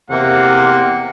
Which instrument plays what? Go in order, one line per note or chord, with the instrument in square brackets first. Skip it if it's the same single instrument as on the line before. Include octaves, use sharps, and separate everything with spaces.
[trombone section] E2 C3 [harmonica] A#3 F#5